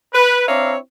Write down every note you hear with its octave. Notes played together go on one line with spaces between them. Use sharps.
B4
C4 D4 E4 C#5 F5 A#5